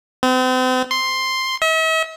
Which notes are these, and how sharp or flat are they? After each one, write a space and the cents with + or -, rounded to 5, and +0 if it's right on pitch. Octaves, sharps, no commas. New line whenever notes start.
C4 -40
C6 +5
E5 -45